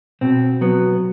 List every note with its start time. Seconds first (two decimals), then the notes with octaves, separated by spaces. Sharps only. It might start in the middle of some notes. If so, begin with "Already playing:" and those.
0.21 B2 C4
0.61 F#3 B3